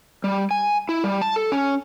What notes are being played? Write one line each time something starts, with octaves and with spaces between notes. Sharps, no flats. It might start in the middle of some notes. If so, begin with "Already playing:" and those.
G3
G#5
E4
G3
A5
A4
C#4